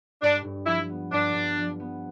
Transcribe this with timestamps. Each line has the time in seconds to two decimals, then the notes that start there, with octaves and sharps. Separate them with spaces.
0.22 G2 D4
0.45 G2
0.66 F3 E4
0.89 B3
1.12 G2 D4
1.35 G2
1.58 F3
1.80 B3